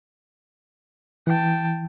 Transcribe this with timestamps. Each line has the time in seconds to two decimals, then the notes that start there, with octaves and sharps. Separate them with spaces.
1.27 E3 G5 A5